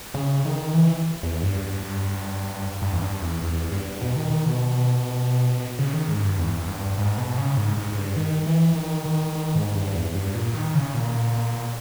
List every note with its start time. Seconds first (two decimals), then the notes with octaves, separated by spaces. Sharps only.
0.14 C#3
0.45 D#3
0.74 E3
1.23 E2
1.43 G2
2.82 G2
2.93 E2
3.02 G2
3.22 E2
3.42 E2
3.72 G2
4.01 B2
4.16 D#3
4.31 D#3
4.46 B2
5.79 C#3
5.93 D#3
6.09 G#2
6.24 G2
6.39 E2
6.68 G2
6.98 G#2
7.18 B2
7.38 C#3
7.57 G#2
7.77 G#2
7.92 G#2
7.97 G2
8.16 D#3
8.47 E3
8.76 D#3
9.06 D#3
9.35 D#3
9.55 G#2
9.75 G2
9.95 E2
10.15 G2
10.35 A#2
10.54 D#3
10.74 C#3
10.94 A#2